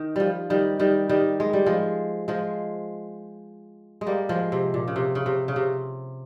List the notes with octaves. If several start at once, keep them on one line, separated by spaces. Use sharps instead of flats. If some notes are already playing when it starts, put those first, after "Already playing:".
Already playing: D#3
F3 G3
D#3 G3
D#3 G3
D#3 G3
G#3
G3
F3 G#3
F3 G#3
G#3
G3 A#3
F3 G#3
C3
A#2
C#3
C3
C#3
C3
C#3
C3